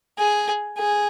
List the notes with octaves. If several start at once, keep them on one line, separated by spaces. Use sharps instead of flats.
G#4
G#4